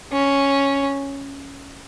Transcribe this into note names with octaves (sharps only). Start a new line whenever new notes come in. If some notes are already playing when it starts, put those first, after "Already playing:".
C#4